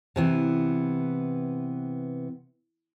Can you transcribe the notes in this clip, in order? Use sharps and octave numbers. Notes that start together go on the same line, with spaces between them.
C3 E3 B3